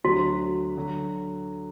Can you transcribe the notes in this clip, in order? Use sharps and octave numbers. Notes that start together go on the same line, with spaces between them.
D2 D3 F#3 F#4
D3 F#3